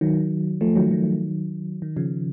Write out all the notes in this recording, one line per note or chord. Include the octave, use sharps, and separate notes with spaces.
D#3 F#3
F3 A3
D#3 F#3
D#3 F#3
D#3
C#3 F3